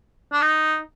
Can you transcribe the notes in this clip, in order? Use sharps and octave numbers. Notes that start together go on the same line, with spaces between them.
D4
D#4